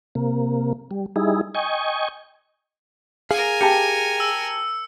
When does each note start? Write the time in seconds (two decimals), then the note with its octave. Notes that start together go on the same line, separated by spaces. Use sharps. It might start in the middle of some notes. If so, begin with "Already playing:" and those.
0.15 C3 A#3
0.91 G3
1.16 G3 D#4 E4 G#4
1.55 D#5 G5 G#5 C#6
3.31 G#4 A#4 F5 G#5
3.61 G4 A5 C#7
4.20 E6